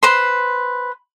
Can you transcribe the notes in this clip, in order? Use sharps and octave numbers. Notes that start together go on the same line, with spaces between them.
B4 C5 C6